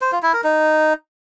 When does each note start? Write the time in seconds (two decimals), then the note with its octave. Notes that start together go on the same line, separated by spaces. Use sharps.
0.02 C5
0.12 F4
0.23 E4
0.33 A#4
0.44 D#4